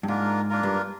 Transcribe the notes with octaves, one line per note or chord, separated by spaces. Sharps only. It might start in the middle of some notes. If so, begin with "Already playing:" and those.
G2
G#2 A#3 D4 F4 A#4
A#3 D4 F4 A#4
G2